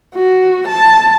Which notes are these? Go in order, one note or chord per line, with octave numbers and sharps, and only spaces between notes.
F#4
A5